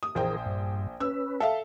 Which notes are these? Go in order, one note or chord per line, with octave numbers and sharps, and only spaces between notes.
D#6
A#1 E3 G#4 A#4 C5 G5
G2
C#4 B4 E6
A4 E5 F5